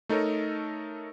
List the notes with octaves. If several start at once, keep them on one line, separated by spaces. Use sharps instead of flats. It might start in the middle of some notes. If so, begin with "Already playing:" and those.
A3 D#4 A4 A#4 C#5